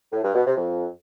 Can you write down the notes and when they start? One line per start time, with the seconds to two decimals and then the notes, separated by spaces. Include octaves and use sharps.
0.13 A2
0.24 G2
0.35 B2
0.46 C3
0.57 F2